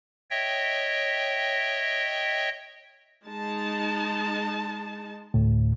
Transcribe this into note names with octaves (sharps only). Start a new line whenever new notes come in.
C#5 D#5 E5 G5
G#3 D#4 A5
D2 A2